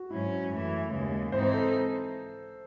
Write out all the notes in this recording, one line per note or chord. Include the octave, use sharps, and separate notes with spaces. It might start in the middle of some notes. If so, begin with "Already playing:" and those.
Already playing: F#4
G#2 F#3 C#4 E4
F#2 E3 A3
D#2 C#3 G#3
G#2 E3 C4 D#4 C5
C5
A4